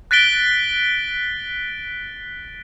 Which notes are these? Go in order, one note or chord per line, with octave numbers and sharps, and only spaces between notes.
F#6 A6 B6 D7 G7